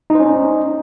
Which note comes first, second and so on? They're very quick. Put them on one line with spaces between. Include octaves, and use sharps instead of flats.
D#4 C5 C#4